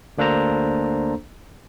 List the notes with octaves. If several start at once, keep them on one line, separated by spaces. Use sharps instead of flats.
D2 A#3 D4 A4 C5 A#5